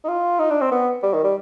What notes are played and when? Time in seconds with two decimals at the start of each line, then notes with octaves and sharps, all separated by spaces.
0.04 D#4
0.08 F4
0.39 D#4
0.50 D4
0.61 C4
0.71 B3
1.03 G3
1.13 D#3
1.24 G3